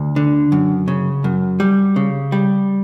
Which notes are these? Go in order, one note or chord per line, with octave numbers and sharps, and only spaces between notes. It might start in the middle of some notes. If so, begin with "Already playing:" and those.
Already playing: D2
D3
F#2
C#3
F#2
G3
C#3
G3